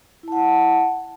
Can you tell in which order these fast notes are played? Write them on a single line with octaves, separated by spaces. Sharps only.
E4 A5 F#5